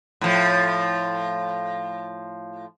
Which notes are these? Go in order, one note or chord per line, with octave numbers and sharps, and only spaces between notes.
A2 F3